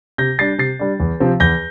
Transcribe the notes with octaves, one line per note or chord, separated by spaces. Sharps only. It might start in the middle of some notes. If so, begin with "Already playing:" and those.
C3 G6 A#6
G3 D4 A6 C7
C3 A6 C7
G3 D4
E2
C3 F3 C4
E2 G6 A#6